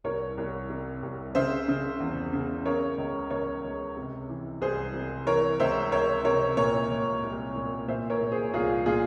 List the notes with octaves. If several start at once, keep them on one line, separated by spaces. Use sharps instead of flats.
C2 A#4 C#5
C2
C3
C2
C#3 C5 E5
C#3
E2
C#3
C#3 A#4 C#5
C#2
C#2 A#4 C#5
C#2
C3
E3
C2 G#4 C5
C3
E3 A#4 C#5
C#2 C5 E5
C#2 A#4 C#5
C3 A#4 C#5
A#2 A#4 C#5
A#2
C2
A#2
A#2 C5 E5
A#4 C#5
A#2
G#4 C5
C2 F4 G#4
A#2 F4 G#4